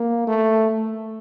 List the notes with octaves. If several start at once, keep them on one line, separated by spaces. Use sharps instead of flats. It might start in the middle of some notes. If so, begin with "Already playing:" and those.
Already playing: A#3
A3